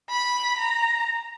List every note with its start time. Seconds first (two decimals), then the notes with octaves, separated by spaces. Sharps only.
0.10 B5
0.59 A#5